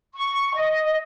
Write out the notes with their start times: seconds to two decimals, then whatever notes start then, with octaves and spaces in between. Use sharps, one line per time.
0.15 C#6
0.55 D#5